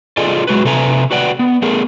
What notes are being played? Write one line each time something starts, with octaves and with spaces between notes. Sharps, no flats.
F4 G#4 A4 D5 D#5
F#3 G#3 F#4 B4
C3 A4 B4 E5 G#5 A#5
F#4 B4 D5 F#5 G5
B3
A3 B3 G#4 A#4